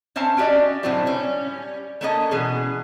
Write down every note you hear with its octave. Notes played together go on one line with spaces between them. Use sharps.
C4 C#4 C5 E5 A5
C#4 F#4 G4 D5 D#5
A2 D3 F#3 A3 C4 E4
G3 C#4
A3 A#3 C#4 A4 B4 D#5
B2 E3 C#4 G#4